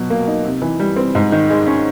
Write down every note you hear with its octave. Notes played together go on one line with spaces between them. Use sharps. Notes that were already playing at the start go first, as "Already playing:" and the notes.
Already playing: B2 F#3
A#3
D#4
C3
E3
G3
C4
G#2
D#3
G#3
C#4